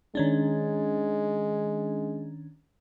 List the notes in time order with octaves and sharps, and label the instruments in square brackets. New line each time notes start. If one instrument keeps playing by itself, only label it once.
[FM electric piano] D#3 C#4 D4 [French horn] G#3